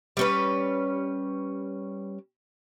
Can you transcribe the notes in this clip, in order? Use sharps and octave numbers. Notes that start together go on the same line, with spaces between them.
G3 C#4 B4